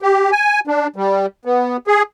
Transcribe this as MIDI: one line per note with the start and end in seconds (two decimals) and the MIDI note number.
0.02 0.30 67
0.32 0.60 80
0.67 0.87 62
0.96 1.26 55
1.45 1.77 59
1.87 2.02 68